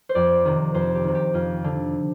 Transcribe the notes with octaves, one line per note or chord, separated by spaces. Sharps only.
C5
F2 D5
C3 D#3
F2 C5
G4
C3 D#3
G4
F2 F4
D3